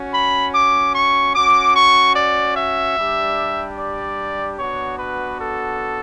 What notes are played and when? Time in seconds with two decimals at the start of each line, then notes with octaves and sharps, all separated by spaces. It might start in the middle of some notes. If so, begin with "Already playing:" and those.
Already playing: C#4 F#4
0.13 B5
0.54 D6
0.94 C#6
1.34 C#4 F#4 D6
1.76 C#6
2.15 D5
2.57 E5
2.97 G3 D4 G4
3.78 D5
4.59 B3 D4 F#4 C#5
4.99 B4
5.40 A4